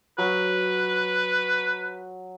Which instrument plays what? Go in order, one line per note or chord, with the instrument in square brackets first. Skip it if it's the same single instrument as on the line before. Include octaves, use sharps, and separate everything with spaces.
[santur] F#3 [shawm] B4